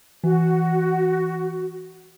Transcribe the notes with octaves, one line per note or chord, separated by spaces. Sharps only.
E3 F#4